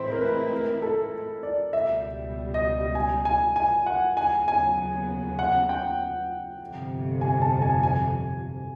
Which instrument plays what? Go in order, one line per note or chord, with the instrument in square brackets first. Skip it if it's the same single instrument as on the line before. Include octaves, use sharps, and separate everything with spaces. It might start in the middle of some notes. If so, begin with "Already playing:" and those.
Already playing: [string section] A2 E3 G#3 C4 E4 [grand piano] C5
[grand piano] A#4
B4
A#4
A4
D5
[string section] C#2 B2 G3 [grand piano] E5
[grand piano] D#5
G#5
G#5
G#5
F#5
[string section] D#2 C#3 F#3 B3 [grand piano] G#5
[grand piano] G#5
F#5
G5
[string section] G1 F2 C3
[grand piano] G#5
A5
G#5
G#5